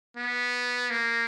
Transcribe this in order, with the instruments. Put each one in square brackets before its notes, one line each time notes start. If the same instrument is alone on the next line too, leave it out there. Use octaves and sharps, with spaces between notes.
[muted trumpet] B3
A#3